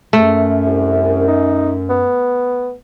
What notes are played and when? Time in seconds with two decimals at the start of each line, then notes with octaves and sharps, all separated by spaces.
0.13 F#2 A3
0.66 C2
1.28 D#4
1.89 B3